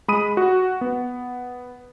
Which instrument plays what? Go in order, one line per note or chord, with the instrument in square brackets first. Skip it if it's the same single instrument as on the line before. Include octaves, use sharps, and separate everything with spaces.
[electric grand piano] G#3 B5 D#6 D#7
F#4
B3